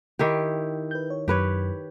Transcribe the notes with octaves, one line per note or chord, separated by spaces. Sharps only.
D#3 E4 G4
B4 G6
C#5
F#2 G4 B4 C#5